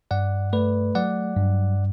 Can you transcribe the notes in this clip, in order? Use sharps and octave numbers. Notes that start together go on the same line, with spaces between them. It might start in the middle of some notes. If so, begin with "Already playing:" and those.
G2 D5 F#5
A3 B4 D5
F#3 D5 F#5
G2